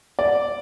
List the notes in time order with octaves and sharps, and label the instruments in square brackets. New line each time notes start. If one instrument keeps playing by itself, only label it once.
[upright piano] D5